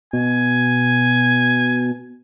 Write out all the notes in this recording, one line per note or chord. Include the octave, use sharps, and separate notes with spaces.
B2 G#5